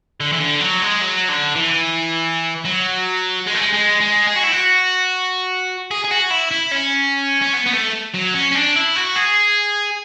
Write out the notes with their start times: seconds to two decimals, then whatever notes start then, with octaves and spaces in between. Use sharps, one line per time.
0.20 D3
0.32 E3
0.40 D3
0.60 F#3
0.82 G#3
1.01 F#3
1.29 D3
1.56 E3
2.65 F#3
3.47 G#3
3.54 A3
3.61 G#3
3.73 G#3
4.01 G#3
4.27 G#4
4.36 F#4
4.44 E4
4.52 F#4
5.91 G#4
6.04 G#4
6.11 F#4
6.30 E4
6.51 E4
6.72 C#4
7.41 C#4
7.53 B3
7.66 B3
7.73 A3
8.14 F#3
8.34 C#4
8.51 C#4
8.55 D4
8.76 E4
8.96 F#4
9.16 G#4